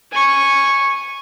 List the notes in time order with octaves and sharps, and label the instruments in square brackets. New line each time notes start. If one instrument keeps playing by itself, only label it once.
[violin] G#5 C#6